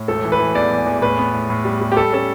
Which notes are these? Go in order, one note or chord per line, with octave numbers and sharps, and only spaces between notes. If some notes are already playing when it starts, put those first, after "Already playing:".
Already playing: A2
E1 A4
E3
B4
E3
E2 D5
E2
E2
A2 B4
B3
A2
A2
G3
G3
G4
G3 A4
C#4 A4